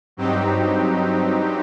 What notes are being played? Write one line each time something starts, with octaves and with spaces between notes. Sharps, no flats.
G2 F#3 C4 D#4 G4